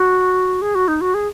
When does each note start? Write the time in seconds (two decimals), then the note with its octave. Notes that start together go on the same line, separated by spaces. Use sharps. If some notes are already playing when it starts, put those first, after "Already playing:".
Already playing: F#4
0.62 G#4
0.75 F#4
0.88 D#4
1.01 F#4
1.14 G#4